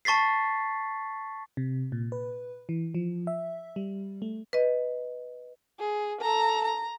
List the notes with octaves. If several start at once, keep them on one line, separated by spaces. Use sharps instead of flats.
A5 C#6 A6 B6 C7
C3
A#2
B4
E3
F3
E5
G3
A3
B4 D#5
G#4
A4 A#5
A#5